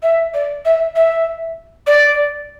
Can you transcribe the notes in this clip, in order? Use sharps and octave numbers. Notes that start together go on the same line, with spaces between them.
E5
D5
E5
E5
D5